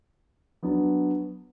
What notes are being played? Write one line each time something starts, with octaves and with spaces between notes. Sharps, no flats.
F#3 B3 D4